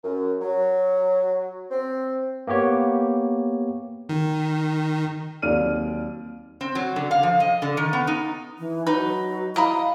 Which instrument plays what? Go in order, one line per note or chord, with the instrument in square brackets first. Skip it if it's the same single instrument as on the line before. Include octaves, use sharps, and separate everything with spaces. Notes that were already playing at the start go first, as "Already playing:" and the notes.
[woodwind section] F#2
F#3
C4
[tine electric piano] A#3 B3 G4 C#5
[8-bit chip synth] D#3
[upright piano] D#2 F#3 C4 D5 F6 D#7
[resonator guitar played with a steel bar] C4
F#3
D3
F5
F3
D#5
D3
D#3
B3
D#4
[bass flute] E3
[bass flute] F#3 [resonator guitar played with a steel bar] D#4 [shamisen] B4
[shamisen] E4 A#5 B5 [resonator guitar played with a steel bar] D#5 [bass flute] F5